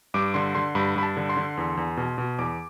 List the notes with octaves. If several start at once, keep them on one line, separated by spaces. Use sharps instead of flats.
G2 D6
D3 C6
D3 C6
G2 B5
G2 B5
A5
D3
C6
D3
E2
E2
B2
B2
E2 D6